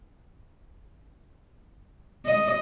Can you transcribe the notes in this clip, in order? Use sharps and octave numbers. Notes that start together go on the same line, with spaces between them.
D#5